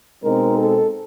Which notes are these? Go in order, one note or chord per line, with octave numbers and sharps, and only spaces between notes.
B2 G#3 C4 D#4 A#4
A4